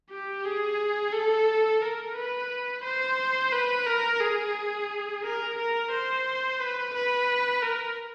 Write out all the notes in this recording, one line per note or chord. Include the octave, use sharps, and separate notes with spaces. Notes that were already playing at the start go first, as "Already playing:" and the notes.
G4
G#4
A4
A#4
B4
C5
B4
A#4
G#4
A#4
A#4
C5
B4
B4
A#4